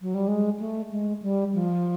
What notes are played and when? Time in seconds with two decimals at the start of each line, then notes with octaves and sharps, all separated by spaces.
0.02 F#3
0.14 G3
0.28 G#3
0.59 A3
0.91 G#3
1.22 G3
1.54 F3